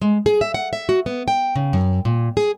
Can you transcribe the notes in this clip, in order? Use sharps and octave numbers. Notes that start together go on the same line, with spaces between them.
G#3
G#4
E5
F#5
E5
F#4
B3
G5
C#3
F#2
A#2
G#4